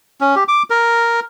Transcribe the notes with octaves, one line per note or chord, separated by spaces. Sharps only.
C#4
G4
D6
A#4